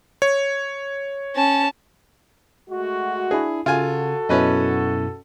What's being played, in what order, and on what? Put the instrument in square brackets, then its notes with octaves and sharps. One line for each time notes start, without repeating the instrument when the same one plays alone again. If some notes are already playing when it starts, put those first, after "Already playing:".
[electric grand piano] C#5
[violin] C#4 A5
[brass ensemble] G#3 A3 F#4
[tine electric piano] D4 E4 [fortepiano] G#4
[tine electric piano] C#3 [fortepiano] F4 G#5 [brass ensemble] F#4 A4
[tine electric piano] F#2 B2 E4 [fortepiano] C#4 B4 D#5